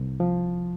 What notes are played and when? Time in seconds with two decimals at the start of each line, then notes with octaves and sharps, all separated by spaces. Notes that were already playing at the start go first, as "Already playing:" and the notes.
Already playing: C2
0.20 F3